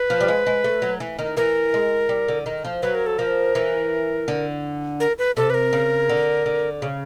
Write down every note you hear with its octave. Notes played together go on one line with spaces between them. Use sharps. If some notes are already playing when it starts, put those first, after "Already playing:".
Already playing: B4
F3
G3
G#3
G#3
A3
F#3
E3
D#3
E3 A#4
G#3
G3
D3
D#3
F3
F#3 B4
A#4
A4
F3 A#4
E3
D3
A#4
B4
C3 A4
B4
A#4
C#3
D3
D3
C#3